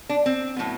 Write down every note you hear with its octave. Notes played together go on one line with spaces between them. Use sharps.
D4
C4
A2 F#3 B3